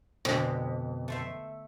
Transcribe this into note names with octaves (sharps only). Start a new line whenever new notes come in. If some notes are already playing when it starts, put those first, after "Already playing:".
F2 B2 D3 G#3
A3 C5 E5